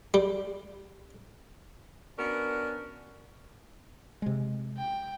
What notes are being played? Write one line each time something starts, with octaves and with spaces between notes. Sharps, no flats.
G3
B3 C#4 D4 F#4 A#4
C3 G#3
G5